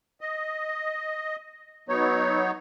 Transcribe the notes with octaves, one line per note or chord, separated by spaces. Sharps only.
D#5
F#3 B3 D#4 C#5